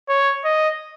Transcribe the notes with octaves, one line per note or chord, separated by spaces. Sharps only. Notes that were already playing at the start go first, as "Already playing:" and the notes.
C#5
D#5